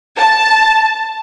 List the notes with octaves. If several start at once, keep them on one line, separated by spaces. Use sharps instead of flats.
A5